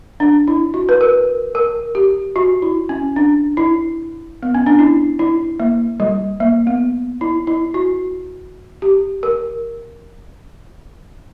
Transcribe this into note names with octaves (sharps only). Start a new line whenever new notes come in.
D4
E4
F#4
B4
A#4
A#4
G4
F#4
E4
C#4
D4
E4
B3
C#4
D4
E4
E4
A#3
G3
A#3
B3
E4
E4
F#4
G4
A#4